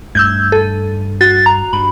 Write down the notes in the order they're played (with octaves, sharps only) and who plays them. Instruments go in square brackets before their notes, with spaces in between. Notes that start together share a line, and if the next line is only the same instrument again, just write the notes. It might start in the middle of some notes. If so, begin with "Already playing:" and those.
[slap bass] G2 A3 [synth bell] E6 G6 G#6
[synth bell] A4
[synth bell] F#4 [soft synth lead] A6
[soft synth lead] A#5
[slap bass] G2 [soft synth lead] B5